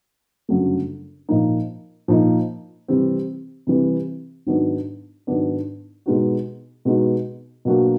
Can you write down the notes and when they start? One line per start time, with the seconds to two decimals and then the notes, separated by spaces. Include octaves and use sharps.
0.49 G1 F#2 C#3 F#3 A3
1.29 A#2 F3 A#3 D#4
2.08 A#2 F3 A#3 D#4
2.88 C3 E3 G3 C4
3.67 C3 E3 G3 C4
4.46 G#2 D#3 F#3 B3 D4
5.27 G#2 D#3 F#3 B3 D4
6.06 B2 G#3 B3 D#4 F#4
6.85 B2 G#3 B3 D#4 F#4
7.65 B2 F#3 A#3 D4 F#4